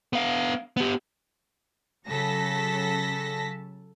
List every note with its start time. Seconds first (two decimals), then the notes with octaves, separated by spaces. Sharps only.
0.13 B3 F5
0.77 B3 G4
2.06 C#3 F#3 A4 A5 A#6 B6